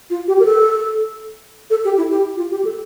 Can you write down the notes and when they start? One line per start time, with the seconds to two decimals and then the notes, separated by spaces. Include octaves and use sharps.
0.10 F4
0.28 G4
0.40 A#4
0.45 A4
1.70 A4
1.85 G4
1.98 E4
2.10 G4
2.37 F4
2.51 G4
2.65 A4